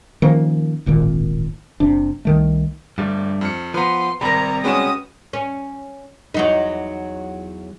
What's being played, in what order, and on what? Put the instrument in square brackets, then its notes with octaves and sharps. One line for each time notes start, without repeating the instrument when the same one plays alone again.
[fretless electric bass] D#3 F3 A#3 C#4
D1 G#1 A#2 D#3
F#1 C3 D4
C2 D#3 A3
[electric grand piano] G1 [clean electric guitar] G2 G3 A3
[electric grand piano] F2 F6 C#7
[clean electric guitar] F3 B3 [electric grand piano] B4 A#5 [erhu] C6
[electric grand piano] G#1 A#4 [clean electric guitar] C3 G3 [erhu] A#5 [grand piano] B5 A#6
[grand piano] G#3 C#4 E7 [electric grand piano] F#4 B4 G5 [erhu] D#6
[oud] C#4
E2 F#3 D#4